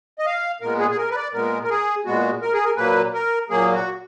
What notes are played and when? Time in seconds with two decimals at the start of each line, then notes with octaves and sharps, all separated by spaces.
0.19 D#5
0.26 F5
0.61 A#2 G#3 B3 A#4
0.79 G#4
0.91 G#4
0.97 A#4
1.11 B4
1.16 D5
1.33 A#2 G#3 B3 A#4
1.64 A#4
1.70 G#4
2.05 A#2 G#3 B3 F#4
2.42 A#4
2.53 G#4
2.65 A#4
2.77 A#2 F#3 A#3 B4
3.14 A#4
3.50 A#2 F#3 A#3 G#4
3.73 F#4